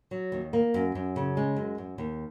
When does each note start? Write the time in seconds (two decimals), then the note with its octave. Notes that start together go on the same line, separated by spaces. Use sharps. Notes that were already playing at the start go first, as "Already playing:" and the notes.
0.11 F#3
0.32 D#2
0.53 A#3
0.74 F#2
0.95 F#2
1.16 C#3
1.37 G#3
1.57 F#2
1.78 F#2
1.98 D#2